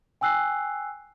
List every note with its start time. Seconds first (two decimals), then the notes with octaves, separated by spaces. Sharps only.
0.21 G5 G#5 E6 F#6 C7